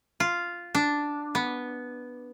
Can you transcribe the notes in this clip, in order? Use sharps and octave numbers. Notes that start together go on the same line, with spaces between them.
F4
D4
B3